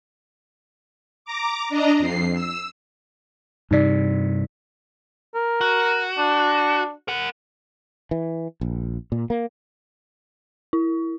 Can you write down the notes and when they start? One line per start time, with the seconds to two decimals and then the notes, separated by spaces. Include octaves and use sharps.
1.25 A#5 D6
1.69 D4 D#5 A#5
1.99 F2 C7
2.34 E6
3.71 G2 C3 D#4 D5
5.35 A#4
5.61 F#4
6.18 D4
7.08 A#4 F#5
8.11 E3
8.61 A#1
9.12 A#2
9.30 A#3
10.73 E4